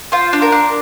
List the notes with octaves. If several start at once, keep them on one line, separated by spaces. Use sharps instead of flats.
F4 C5
D4
A#4
D4